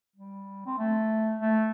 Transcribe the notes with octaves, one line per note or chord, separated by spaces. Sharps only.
G3
C4
A3
A3